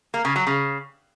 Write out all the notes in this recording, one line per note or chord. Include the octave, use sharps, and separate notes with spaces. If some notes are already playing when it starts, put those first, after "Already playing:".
A#3
C#3
F#3
C#3